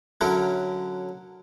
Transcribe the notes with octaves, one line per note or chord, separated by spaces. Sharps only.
D3 F#3 C#4 E4 A#4